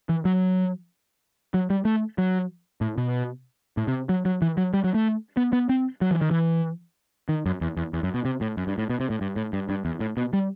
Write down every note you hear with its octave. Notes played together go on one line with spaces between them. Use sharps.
E3
F#3
F#3
G3
A3
F#3
A2
B2
A2
C3
F#3
F#3
E3
F#3
G3
F#3
A3
B3
B3
C4
F#3
E3
D#3
E3
D#3
F#2
E2
E2
E2
F#2
B2
C3
A2
F#2
G2
A2
B2
C3
A2
G2
A2
G2
G2
E2
A2
B2
G3